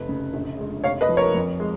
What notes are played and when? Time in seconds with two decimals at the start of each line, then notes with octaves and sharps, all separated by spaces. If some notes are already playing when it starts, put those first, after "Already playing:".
Already playing: F1 B4
0.09 C#3
0.34 A#1
0.59 G#3
0.84 F1 C#5 F5
1.01 B4 D#5
1.09 F3
1.17 A#4 C#5
1.34 F2
1.60 G#3